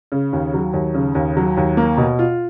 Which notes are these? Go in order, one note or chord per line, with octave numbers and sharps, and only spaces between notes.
C#3
D#2
F#3
D#2
C#3
D#2
F#3
D#2
A#3
B2
F4